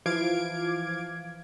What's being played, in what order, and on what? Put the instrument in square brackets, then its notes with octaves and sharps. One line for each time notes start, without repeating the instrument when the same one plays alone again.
[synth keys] E3 F3 F5 D6 G#6 D7